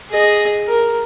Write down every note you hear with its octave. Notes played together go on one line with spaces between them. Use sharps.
G#4 D#5
A#4